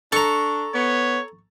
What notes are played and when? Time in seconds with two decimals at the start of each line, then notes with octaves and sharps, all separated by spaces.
0.12 D4 A4 A#5 C#6
0.74 B3 C#5